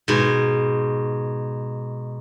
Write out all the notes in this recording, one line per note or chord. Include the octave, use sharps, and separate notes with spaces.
G#2 B2